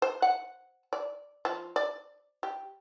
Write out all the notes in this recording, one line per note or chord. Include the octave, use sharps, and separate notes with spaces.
C5
F#5
D5
F3
D5
G4